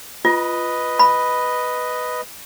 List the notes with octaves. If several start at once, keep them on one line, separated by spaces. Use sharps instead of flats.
F4 B4 D#5
B5